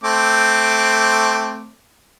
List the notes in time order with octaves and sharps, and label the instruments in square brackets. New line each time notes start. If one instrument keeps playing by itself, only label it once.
[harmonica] A3 C4 D6